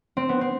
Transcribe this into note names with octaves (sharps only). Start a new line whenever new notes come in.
C4
B3
C4